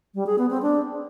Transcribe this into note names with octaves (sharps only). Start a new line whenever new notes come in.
G3
G#4
B3
C4
D4